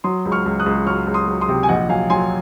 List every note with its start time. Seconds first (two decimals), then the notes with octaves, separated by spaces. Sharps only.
0.04 F#3 C6 D#6
0.25 C#2
0.32 C#6 F6
0.46 C#2
0.60 D#6 F#6
0.66 C#2
0.86 F#3 C#6 F6
1.07 C#2
1.14 C6 D#6
1.28 F#3
1.41 C6 D#6
1.49 C3
1.63 G#5
1.69 A#1 D#5 F#5
1.89 F#3 F5 G#5
2.10 F#3 G#5 C6